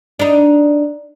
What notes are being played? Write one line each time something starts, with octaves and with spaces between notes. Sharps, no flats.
D4 D#4